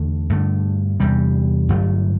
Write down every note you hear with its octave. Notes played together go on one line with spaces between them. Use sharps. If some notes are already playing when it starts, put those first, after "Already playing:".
Already playing: E2 D3 A3
G2 D3 A3
E2 C3 G3
G1 G2 F#3 A3